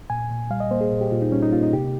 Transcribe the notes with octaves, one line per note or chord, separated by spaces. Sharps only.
A#2 G#5
A#2
G3 F5
D#5
A#3 C5
G#4
A#2
G4
A#2 F4
D#4
G3 C#4
D#4
A#3 F4
D#4
C3 G4